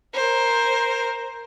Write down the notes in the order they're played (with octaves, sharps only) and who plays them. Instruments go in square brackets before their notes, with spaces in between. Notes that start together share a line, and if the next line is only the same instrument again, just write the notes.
[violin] A#4 C5